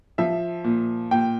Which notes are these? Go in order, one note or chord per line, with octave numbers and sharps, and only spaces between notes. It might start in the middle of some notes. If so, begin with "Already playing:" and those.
F3 E5
A#2
A#2 G5